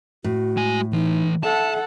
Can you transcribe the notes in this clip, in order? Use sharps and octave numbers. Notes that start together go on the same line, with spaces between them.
A2 F#4
G#3 G#5
E3 A3 D#4
A4 E5 F#5 A5